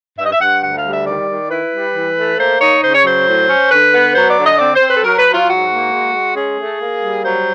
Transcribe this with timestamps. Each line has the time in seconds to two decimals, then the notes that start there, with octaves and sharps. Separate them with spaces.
0.18 G2 E5
0.24 D#5
0.32 E5
0.40 G2 F#5
0.62 D2 F#5
0.77 F5
0.84 G3
0.92 E5
1.06 D#3 D5
1.28 D#3
1.50 E4 B4
1.72 G3
1.95 E3
2.16 A3
2.38 A#3 C5
2.61 D#4 C#5
2.83 C#3 C5
2.94 C#5
3.04 F#3 C5
3.27 A2
3.49 C#4
3.71 D3 B4
3.92 B3
4.15 F#3 C5
4.30 D5
4.37 D3
4.45 D#5
4.59 C4 D5
4.74 C5
4.81 C4
4.88 B4
4.96 A4
5.03 F#3 A#4
5.18 B4
5.25 F#3
5.33 F4
5.47 G#2 F#4
5.70 A#3
5.92 G#3
6.13 G#3
6.35 C#4 G#4
6.58 A3
6.80 A#3
7.02 G3
7.24 F#3 C5